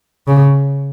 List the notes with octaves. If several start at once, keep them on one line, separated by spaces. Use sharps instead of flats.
C#3